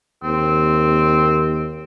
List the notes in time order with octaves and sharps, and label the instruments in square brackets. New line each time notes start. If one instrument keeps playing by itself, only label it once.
[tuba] D#2 [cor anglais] C4